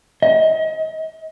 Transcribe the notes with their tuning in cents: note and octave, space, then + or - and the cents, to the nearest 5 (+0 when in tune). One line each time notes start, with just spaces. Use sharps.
D#5 +40